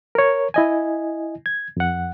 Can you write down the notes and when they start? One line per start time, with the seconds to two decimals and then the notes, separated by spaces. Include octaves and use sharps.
0.15 A#4 C#5
0.54 E4 D#5 G#5
1.46 G#6
1.77 F2 F#5